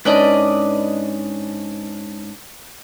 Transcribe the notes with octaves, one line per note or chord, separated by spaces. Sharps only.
G#2 C#4 D4 B4 D5 D#5